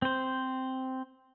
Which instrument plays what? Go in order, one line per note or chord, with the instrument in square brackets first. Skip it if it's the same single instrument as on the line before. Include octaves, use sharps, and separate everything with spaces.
[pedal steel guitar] C4 C5